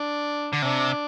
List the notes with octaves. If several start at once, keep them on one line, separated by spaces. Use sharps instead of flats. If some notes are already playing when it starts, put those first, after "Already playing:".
Already playing: D4
D3
C3 D4